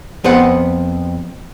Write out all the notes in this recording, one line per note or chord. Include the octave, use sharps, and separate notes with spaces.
F2 B3 C5 F#5